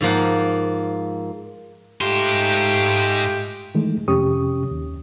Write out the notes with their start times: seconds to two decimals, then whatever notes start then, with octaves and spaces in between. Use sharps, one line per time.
0.01 G#2 F3 A#3 F#5
2.01 G#2 A3 F4 G4 C6
3.75 D#3 E3 G#3 A3
4.08 F2 C3 C#4 G4 C#6 D#6
4.71 D#2